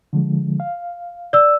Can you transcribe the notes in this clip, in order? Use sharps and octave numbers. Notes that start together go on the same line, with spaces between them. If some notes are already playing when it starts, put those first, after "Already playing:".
D3 F3 G#3
F5
D5 E6